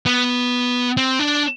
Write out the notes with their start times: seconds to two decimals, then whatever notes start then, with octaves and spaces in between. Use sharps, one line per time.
0.06 B3
0.97 C4
1.19 D4